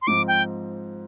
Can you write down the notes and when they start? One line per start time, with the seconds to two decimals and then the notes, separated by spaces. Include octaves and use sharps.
0.02 C6
0.07 G#2 F3 C4 D6
0.28 G5